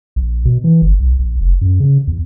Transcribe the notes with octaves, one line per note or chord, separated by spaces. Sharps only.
A#1
B2
E3
G1
B1
A#1
F1
F#2
C#3
E2